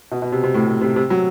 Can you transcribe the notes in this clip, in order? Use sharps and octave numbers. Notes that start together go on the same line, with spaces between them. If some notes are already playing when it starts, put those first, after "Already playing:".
B2
B2
C3
C3
A2
C3
C3
C3
F#3